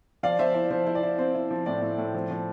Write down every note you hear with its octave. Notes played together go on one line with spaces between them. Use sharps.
F3 D5 F5
F3 C5 E5
E4 D5
F3 C5
E4 C5
D5
E4
C4 C5
E4
F3
A2 D5
A2
A2
F3
F3